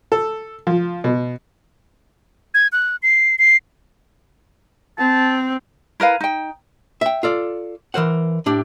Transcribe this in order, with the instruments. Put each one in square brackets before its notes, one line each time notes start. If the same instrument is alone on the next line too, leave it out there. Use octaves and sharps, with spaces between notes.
[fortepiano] A4
F3
B2
[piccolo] G#6
F#6
C7
C7
[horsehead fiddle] C4 [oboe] A5
[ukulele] E4 A#4 B4 F5
D#4 G5
[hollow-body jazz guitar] E5 G5
F4 A4 D5
E3 A#4 C5 F#5
A2 D4 G4